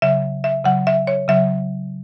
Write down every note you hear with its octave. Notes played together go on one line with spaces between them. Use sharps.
C#3 F#3 E5
E5
C#3 F#3 F#5
E5
C#5
C#3 F#3 E5